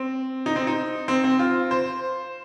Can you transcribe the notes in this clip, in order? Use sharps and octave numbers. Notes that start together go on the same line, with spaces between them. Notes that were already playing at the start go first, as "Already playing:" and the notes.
Already playing: C4
D#4
C4
D#4
C4
C4
F4
C5